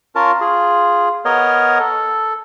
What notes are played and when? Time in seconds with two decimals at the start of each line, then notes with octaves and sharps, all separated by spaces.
0.15 C#4 F4 A#4 A5
0.41 F4 G#4
1.25 B3 A#4 C#5 D#5
1.79 A4